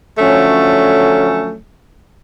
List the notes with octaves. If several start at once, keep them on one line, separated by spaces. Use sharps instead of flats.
D3 F3 F#3 A3 C#4